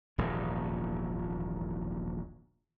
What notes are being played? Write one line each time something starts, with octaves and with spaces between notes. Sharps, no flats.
D#1 A#1 E2 G#2